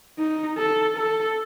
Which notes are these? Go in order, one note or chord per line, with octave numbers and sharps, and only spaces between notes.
D#4
A4
A4